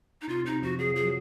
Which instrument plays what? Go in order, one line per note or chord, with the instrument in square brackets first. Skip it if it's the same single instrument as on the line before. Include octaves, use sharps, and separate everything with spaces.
[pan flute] D#4
[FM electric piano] C3 [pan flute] F4
[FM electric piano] C3 [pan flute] D#4
[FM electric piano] F2 F3 [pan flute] F#4
[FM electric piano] F#3 [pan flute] G#4
[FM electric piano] F3 [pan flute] G#4
[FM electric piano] F#3